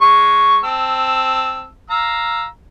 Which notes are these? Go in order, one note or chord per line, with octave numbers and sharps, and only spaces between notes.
G#3 C#6
C4 A5 E6
F5 A#5 E6